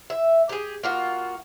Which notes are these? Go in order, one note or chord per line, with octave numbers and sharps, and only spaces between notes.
E5
G4 G#4
A#3 F4 F#4